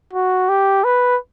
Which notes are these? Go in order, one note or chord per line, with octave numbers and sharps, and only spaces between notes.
F#4
G4
B4